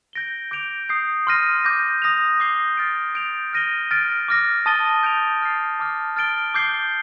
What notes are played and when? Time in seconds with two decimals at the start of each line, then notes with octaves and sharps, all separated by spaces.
0.13 G6 A#6 D7 G7
0.51 D6 G6 D7 F7
0.89 D#6 G6 C7
1.27 C6 F6 A#6 D#7
1.64 D6 G6 A#6
2.02 D#6 A#6 F7
2.40 D6 G6 C7 G7
2.77 F6 A6 D7
3.15 G6 D7 F7
3.53 F6 A#6 D#7 G7
3.91 F6 A6 D7
4.28 D6 F6 A#6
4.66 A5 D#6 A6 D#7 G7
5.03 G6 D7 F7
5.42 F6 A6 C7
5.79 A5 D6 F6
6.16 F6 A6 D7 G7
6.54 D6 G6 C7 G7